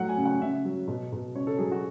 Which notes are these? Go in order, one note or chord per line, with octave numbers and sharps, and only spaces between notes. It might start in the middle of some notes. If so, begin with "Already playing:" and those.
Already playing: A2 F#3 F#5
G#5
C#3
F#5
C#3 E5
F#3
B2
B2
C#3 C#5
A4
F#3 G#4
F#4